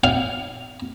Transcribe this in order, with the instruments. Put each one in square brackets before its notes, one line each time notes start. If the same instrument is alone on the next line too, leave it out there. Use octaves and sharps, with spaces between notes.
[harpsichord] F5